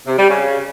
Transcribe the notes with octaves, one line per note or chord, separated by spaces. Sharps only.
C3
G3
C#3